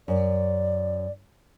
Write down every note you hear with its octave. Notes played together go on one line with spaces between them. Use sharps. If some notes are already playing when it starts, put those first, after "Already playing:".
F#2 D5